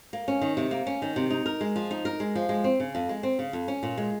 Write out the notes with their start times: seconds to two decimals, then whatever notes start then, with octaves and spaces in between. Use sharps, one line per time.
0.13 A#3
0.28 C#4
0.41 D#3
0.57 C3
0.71 A#3
0.87 C#4
1.02 D#3
1.16 C3
1.30 D#4
1.46 A#4
1.61 G#3
1.76 F3
1.91 D#4
2.05 A#4
2.20 G#3
2.35 F3
2.49 G#3
2.64 C4
2.80 C#3
2.95 F2
3.09 G#3
3.23 C4
3.39 C#3
3.53 F2
3.68 C#4
3.83 A#2
3.98 G#3